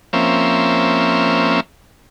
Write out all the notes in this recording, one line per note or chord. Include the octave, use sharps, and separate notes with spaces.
F3 A#3 C4 C#4 E5